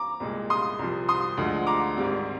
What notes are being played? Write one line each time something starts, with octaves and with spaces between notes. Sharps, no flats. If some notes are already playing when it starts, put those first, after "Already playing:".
Already playing: A#5 D6
C2 A#2 G#3
C6 D#6
C2 C3 F3
C6 D#6
D2 D3 F3 G#3
A#5 D6
G#1 G#2 G3 C4